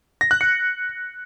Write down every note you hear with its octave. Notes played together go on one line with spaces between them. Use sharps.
A#6
F#6
C#7